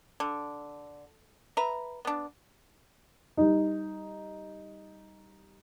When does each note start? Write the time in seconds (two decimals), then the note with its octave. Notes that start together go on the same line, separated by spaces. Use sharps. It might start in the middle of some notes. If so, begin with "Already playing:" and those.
0.20 D3
1.57 B4 E5 A#5
2.05 B3 D4
3.37 G3 D#4